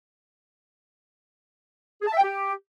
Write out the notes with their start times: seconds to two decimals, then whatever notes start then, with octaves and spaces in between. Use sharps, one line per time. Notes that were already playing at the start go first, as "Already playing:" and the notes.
2.01 G#4
2.07 A5
2.12 E5
2.17 G5
2.22 G4